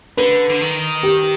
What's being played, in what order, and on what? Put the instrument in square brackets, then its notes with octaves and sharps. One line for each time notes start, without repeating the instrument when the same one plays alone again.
[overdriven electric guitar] D3 [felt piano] B4
[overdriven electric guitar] D3
D#3
[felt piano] G4